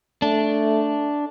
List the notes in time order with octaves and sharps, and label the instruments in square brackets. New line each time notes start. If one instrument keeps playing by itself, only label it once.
[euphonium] A3 [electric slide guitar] D4